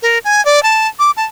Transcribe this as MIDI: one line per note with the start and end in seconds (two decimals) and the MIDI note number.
0.02 0.18 70
0.25 0.43 80
0.45 0.62 74
0.63 0.88 81
0.99 1.11 86
1.17 1.25 81